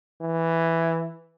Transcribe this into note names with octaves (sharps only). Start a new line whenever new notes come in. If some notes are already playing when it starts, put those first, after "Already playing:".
E3